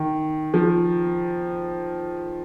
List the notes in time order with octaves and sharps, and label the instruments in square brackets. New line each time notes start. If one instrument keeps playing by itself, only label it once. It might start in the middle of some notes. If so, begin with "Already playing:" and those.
Already playing: [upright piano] D#3
F3